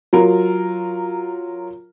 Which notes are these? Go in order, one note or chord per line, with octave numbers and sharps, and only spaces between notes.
F#3 F4 A#4